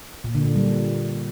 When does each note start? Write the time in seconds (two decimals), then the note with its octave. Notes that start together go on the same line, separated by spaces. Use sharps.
0.24 A#2
0.35 D3
0.45 A#2
0.56 G3
0.66 G3